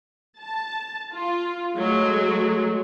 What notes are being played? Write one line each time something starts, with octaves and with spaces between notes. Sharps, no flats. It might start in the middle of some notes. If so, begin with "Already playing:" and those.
A5
F4
F#3 G#3 A3